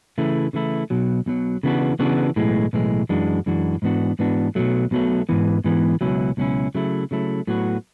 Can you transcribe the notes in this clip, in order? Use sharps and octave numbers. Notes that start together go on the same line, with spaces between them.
C#3 E3 A3 E4
C#3 E3 A3 E4
B1 B2 F#3
B1 B2 F#3
C#3 E3 B3 D4 F#4
C#3 E3 B3 D4 F#4
B1 A2 E3 G#3
B1 A2 E3 G#3
F#2 E3 G#3 D4 F#4
F#2 E3 G#3 D4 F#4
G#2 E3 B3 D4 F#4
G#2 E3 B3 D4 F#4
B1 B2 F#3 A3
B1 B2 F#3 A3
G#2 E3 B3
G#2 E3 B3
C#2 B2 F#3 C#4 E4
C#2 B2 F#3 C#4 E4
C#3 F#3 A3 E4
C#3 F#3 A3 E4
A2 F#3 B3 F#4